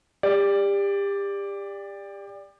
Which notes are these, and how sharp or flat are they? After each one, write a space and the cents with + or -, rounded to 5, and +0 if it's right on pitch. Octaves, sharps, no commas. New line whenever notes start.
G4 +30 D5 +0